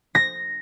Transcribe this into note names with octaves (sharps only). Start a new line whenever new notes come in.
A#6